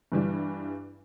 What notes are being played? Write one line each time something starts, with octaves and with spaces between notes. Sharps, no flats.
G2 E3 G3